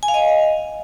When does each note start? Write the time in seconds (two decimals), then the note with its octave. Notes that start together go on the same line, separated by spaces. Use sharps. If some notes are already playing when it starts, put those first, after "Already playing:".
0.03 G#5
0.08 F5
0.14 D#5